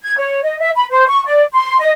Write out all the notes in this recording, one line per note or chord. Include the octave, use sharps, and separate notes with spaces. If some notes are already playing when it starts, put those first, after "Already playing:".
G#6
C#5
D#5
E5
B5
C5
C#6
D5
C6
D#5